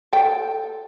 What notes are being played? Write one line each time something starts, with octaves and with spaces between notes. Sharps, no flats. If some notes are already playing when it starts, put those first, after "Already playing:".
A4 G5